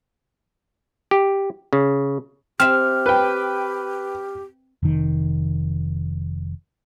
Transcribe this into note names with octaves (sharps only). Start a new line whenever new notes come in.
G4
C#3
C4 G4 E5 F6
B4 G5
F1 D#3